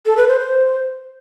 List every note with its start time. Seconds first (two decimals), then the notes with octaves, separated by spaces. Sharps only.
0.06 A4
0.17 B4
0.28 C5
0.40 C5